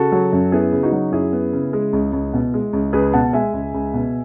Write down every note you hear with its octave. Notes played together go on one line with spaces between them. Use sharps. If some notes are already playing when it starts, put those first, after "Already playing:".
Already playing: C#3 F#4 A4
F#3
F#2
B3 E4 G#4
C#3
D#4 F#4
F#3
F#2 E4 G#4
B3
C#3
G#3
C#2
C#2
B2
G#3
C#2
C#2 G#4 B4
B2 F#5 A5
G#3 E5 G#5
C#2
C#2
B2